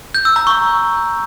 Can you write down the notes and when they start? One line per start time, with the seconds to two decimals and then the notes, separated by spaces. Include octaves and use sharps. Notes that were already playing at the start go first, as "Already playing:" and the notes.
0.15 G6
0.25 E6
0.36 A#5
0.47 C#6